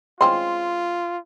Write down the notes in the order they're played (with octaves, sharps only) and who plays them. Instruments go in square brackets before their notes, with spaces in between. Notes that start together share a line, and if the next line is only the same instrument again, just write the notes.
[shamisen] G#3 C4 C#4 [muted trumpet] F4 [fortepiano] C6